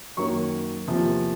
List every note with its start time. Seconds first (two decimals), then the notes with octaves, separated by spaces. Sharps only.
0.17 F#2 D#3 F#3 A#3 C#6
0.88 E2 C3 F3 A#3